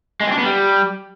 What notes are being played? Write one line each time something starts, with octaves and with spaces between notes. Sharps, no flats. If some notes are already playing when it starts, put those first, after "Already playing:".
G#3
C4
D4
B3
G3